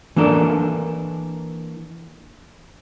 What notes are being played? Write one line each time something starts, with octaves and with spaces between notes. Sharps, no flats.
E3 A#3 D4 A4 A#4